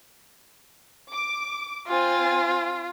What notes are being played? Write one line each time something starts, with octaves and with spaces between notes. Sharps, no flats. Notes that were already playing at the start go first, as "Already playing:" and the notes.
D6
C4 F4 G#5 A6